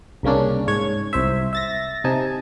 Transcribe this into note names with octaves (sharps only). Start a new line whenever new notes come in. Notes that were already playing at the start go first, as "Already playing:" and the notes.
C2 C#3 A#3 C#4 D4
G#2 C#5 G#6
C2 C5 E5
E5 A6 A#6
C3 D#4 G#5 A5